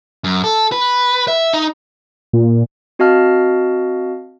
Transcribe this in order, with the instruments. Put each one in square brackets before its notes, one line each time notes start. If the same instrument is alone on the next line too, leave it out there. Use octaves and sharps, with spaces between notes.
[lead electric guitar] F#2
A4
B4
E5
D#4
[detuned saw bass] A#2
[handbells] C4 F#4 D#5 F5 A5 F6